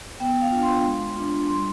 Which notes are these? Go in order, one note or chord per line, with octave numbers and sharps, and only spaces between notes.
B3 G5
F5
D4 F4
C6
G#3
D4 F4
G3 C6